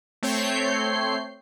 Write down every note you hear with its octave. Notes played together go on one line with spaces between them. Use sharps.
A3 C4 C#5 G6 C7